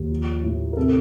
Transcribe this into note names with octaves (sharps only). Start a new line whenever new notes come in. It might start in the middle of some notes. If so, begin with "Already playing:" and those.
Already playing: D#2
F3
A2
A#4
C3 A4